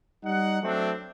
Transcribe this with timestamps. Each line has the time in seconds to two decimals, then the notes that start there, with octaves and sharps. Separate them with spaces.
0.24 G3 D#4 F#5
0.63 F#3 A3 C4 D4